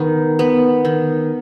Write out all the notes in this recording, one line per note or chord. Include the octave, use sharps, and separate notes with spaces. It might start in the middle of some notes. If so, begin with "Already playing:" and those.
Already playing: D#3 B3
B3
D#3